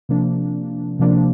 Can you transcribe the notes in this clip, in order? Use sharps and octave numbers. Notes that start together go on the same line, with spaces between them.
C3 F3 A#3 D4
C3 F3 A#3 D4